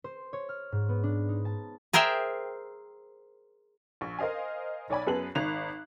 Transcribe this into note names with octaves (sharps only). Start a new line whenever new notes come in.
C5
C#5
F6
G#2
B3
D4
D#4
A5
G#4 A#4 C5 E5 G5
A#1 C#6
A#4 C5 D#5 F5 G#5
B1 C#5 D5 G#5 B5
F#2 B3 G#4 B4 A5 F#7
G#1 D#3 F#6 F7